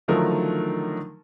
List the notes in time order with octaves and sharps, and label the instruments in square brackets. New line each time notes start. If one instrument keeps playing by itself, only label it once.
[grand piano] D3 D#3 F3 F#3 A3 A#4